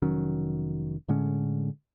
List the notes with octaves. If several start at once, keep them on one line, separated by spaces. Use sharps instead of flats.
F1 D#3 F#3 C#4
A2 D3 G#3 C#4